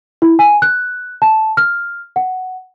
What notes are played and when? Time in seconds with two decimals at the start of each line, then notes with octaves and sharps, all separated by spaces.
0.22 E4
0.39 G#5
0.62 F#6
1.22 A5
1.57 F6
2.16 F#5